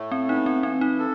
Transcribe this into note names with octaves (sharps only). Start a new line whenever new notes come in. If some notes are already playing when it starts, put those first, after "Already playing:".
Already playing: A2 A3
C4
B3 D#4
C4
E3 C4
D#4
A4